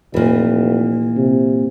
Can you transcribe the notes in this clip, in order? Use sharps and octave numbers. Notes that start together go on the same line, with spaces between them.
F1 A#2 E3
C3